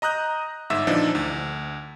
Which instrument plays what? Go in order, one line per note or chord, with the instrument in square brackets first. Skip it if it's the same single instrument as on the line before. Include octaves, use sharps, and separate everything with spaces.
[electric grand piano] D#5 A#5 D#6 F#6 G6
G1 G#2 E5 E6
A#2 E3 F3 D4 D#4
D2